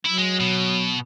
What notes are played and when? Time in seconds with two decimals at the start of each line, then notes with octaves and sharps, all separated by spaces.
0.05 F#3 E4
0.18 G#3
0.40 B2